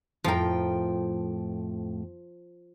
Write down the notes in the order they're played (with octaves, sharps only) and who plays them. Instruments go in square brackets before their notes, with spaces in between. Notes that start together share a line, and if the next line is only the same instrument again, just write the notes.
[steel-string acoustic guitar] F2 A2 G5 [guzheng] F3 A#4